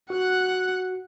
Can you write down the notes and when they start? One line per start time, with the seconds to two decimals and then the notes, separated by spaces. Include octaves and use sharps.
0.10 F#4 F#5 F#6